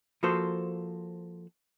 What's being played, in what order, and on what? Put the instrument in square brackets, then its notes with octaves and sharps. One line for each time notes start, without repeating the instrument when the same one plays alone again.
[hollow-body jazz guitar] F3 A#3 F#4 A4 C5